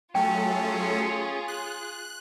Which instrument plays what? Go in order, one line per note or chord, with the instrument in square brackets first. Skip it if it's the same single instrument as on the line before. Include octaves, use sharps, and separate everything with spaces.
[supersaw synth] F#3 A3 A4 [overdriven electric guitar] C#4 [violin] F4 G#4 [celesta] G5
[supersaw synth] F#6